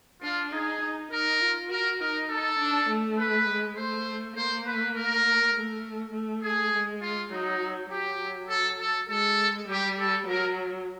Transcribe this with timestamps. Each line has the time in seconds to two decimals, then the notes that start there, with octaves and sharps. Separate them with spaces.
0.22 D4 F4
0.52 D#4 G#4
0.82 D#4
1.11 D#4 A#4
1.41 F4
1.70 F#4 A#4
2.00 D#4 A#4
2.29 A4
2.59 D4
2.89 A3
3.18 B4
3.48 G#3
3.77 A3 C5
4.37 A#3 C5
4.66 B4
4.95 A#4
5.55 A3
6.13 A3
6.43 G#4
6.73 G#3
7.02 F4
7.32 F#3 D#4
7.91 F#3 G4
8.50 A4
8.80 A4
9.09 G#3 A4
9.68 G3 G4
9.98 A4
10.27 F#3 A#4